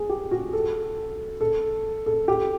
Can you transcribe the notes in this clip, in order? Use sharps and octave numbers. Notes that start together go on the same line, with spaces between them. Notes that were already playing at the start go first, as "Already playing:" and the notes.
Already playing: G#4
G4
F#4
A4
A4
A4
G4